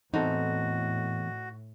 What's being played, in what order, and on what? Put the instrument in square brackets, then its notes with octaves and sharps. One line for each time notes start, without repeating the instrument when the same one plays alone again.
[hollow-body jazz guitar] E2 C4 A4 [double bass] A2 [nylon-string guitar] D#4 [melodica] F#4